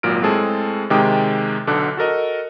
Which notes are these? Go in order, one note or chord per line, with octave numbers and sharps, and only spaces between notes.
G#1 A#2 F#3 F6 D7
A2 G#3 C4 G#4 A4 A5
C3 D#3 G#3 G5 D6 D#6
B1 B2 D3 A4 D6 F#6
F#4 A4 A#4 D#5